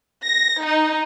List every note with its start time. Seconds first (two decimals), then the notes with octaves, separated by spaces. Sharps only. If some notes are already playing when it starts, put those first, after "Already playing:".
0.24 A#6
0.62 D#4